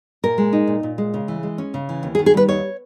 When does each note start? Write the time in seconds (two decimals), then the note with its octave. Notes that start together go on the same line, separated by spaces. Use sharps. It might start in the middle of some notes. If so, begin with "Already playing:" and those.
0.23 A#2 A#4
0.38 G#3
0.53 D#4
0.67 A#2
0.83 A#2
0.98 G#3
1.14 C#3
1.28 E3
1.43 G#3
1.58 C#4
1.74 C#3
1.89 E3
2.03 D#2
2.15 G#4
2.19 D#3
2.26 G#4
2.34 G3 B4
2.49 D#2 C#5